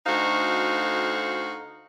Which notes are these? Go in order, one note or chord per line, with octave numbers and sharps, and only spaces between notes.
D2 D#4 F#4 C5 F5